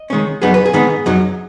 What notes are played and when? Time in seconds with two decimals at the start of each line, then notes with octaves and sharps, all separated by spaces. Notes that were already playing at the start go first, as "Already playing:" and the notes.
Already playing: D#5
0.10 D#3 G#3 C#4
0.42 F#2 F#3 B3 D#4 G#4
0.54 B4
0.65 G#4
0.73 G#2 D#3 B3 D#4
1.06 F#2 F#3 D#4